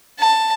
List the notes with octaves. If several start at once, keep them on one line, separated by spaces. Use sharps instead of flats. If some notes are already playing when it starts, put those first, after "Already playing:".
A5